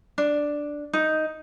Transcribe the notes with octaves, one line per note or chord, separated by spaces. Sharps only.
D4
D#4